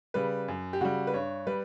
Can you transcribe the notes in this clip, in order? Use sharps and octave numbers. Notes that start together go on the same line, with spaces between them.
C#3 G3 B4
F#2
G4
C#3 G3 F#4
B4
G2 C#5
G3 B4